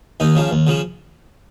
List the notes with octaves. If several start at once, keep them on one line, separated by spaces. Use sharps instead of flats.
D#2 D#4
C#3 F3
D#2
C#3 F3